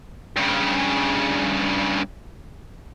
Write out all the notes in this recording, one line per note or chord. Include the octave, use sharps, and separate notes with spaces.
G2 C#3